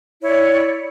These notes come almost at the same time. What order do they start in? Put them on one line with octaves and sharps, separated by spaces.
E4 C#5 D5